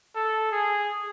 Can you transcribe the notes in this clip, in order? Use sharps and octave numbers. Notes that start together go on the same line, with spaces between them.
A4
G#4